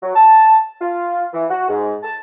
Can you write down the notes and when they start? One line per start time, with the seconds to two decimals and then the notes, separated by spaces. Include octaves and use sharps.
0.03 F#3
0.15 A5
0.80 F4
1.34 E3
1.50 F#4
1.69 G#2
2.03 A5